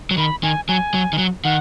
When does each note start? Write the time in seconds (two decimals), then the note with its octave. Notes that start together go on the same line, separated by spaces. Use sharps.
0.11 F#3
0.17 D#3 B5
0.43 D#3 G#5
0.68 F#3 G#5
0.94 F#3
1.13 D#3
1.18 F#3
1.44 D#3 F#5